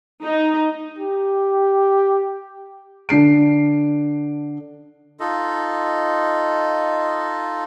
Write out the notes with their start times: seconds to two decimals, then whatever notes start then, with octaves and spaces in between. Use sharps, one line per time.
0.23 D#4
0.98 G4
3.09 D3 D4 C7 D7
5.20 D#4 F4 A4 D#5